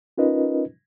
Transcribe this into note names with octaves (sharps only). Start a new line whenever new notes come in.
C#4 D#4 F4 A#4 B4 D#5